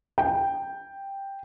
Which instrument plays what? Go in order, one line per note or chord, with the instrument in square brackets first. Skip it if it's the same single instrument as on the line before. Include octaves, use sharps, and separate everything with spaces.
[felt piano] G5